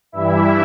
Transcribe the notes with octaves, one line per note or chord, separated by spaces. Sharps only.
G2 E3 G3 E4 E5